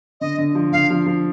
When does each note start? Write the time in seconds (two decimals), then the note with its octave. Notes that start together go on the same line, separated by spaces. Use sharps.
0.21 D3 D#5
0.38 D3
0.55 F3
0.72 D3 F5
0.90 F3
1.06 F3